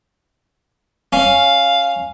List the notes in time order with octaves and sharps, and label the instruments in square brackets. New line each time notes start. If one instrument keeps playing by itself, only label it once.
[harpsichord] C#4 [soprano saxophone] F5